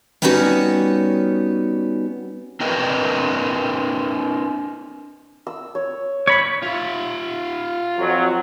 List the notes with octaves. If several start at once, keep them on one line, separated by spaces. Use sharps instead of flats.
G3 B3 C#4 D#4 F#4 C#5
C4 D4 A#4 B4 D#5
E6
C#5
C#5 B5
F4 E5
F2 F#3